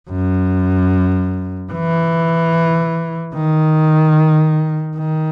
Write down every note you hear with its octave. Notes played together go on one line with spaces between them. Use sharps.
F#2
E3
D#3
D#3